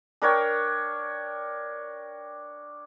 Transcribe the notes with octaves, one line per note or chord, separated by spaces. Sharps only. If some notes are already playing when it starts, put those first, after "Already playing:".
D4 A#4 C#5 G5